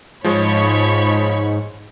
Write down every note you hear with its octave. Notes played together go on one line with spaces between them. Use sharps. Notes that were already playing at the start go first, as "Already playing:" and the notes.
G#2 F3 G#3 C#5 B5 C#6